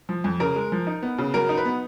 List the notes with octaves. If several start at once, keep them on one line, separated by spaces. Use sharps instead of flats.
F3
F2
C#3 A#4
G#3
F3
D#4
B3
C#3
F#3 A#4
D#4
B4
B3